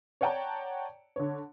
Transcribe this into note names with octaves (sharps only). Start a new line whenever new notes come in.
C#5 D5 F#5 G5 A5 A#5
D3 C#5